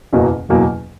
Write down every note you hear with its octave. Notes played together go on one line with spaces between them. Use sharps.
F#1 E2 B2 F#3 A#3
F#1 E2 B2 F#3 A#3